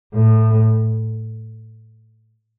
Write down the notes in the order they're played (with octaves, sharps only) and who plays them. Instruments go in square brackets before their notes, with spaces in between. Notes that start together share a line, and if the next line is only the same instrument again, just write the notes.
[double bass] A2